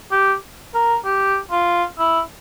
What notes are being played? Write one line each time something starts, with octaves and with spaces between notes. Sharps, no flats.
G4
A#4
G4
F4
E4